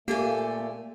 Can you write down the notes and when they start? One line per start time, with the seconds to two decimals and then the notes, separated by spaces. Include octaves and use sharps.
0.08 A#2 A3 A#3 G4 A4 G#5